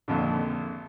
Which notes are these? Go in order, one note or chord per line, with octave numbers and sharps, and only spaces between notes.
G#1 F2 A#2 D3